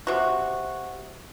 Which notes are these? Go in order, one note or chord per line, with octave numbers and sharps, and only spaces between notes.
C3 F#4